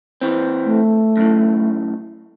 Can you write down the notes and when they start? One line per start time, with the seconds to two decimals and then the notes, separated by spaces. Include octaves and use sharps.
0.21 E3 C4
0.65 A3
1.17 F#2 A2